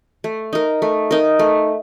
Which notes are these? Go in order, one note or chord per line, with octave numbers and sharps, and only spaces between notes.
A3
D#4 A#4
A3
D#4 A#4
A3